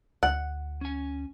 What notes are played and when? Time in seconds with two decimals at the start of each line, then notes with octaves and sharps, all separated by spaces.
0.23 D2 F#5
0.81 C#4 G#5